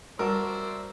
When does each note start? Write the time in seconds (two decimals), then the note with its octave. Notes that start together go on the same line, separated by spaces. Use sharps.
0.19 G3 F#4 A#4 C5 D5 E5 A5